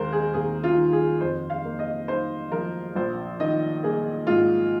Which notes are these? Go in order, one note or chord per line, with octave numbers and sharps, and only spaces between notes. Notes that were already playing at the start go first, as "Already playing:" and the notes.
Already playing: D#2 G#3 A#4 C5
G#4
D#2 G#4
F4
D#3
G#4
F2 C5
F5
A#3
D#5
D#4 C5
F3 A#4
A#1 C5
D#3 D#5
A#3 G#4
G#2 F4